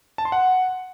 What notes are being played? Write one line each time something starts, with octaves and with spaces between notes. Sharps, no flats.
A5
C6
F#5